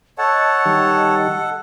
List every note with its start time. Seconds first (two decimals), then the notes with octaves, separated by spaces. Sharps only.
0.18 A4 C#5 D#5 F#5 A5
0.66 D#3 G3